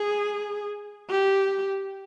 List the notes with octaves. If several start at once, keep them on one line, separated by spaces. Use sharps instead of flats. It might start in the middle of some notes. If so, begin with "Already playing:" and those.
Already playing: G#4
G4